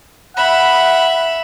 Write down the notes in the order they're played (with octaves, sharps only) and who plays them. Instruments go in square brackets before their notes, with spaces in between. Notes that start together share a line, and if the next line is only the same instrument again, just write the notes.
[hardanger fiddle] E5 B5 [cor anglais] F#5